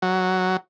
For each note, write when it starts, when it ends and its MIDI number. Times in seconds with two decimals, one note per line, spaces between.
0.02 0.57 54